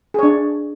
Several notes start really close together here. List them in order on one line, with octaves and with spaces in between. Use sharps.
G#4 C#5 D4